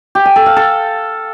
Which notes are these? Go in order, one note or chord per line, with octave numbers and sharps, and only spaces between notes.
G4
G#5
A4
F5
A4